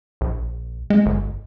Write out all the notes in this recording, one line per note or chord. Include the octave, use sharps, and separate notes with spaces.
A#1
G#3
G1